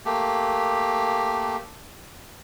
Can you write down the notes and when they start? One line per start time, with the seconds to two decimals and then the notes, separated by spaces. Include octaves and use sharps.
0.05 A3 A#3 G4